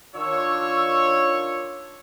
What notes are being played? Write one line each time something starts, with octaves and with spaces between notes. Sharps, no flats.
D#3 D4 F4 C#5 C#6 E6